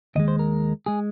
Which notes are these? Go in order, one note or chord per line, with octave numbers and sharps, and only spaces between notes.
D#2 D#3 G#3 D#5
C5
A#4
G#3 G#4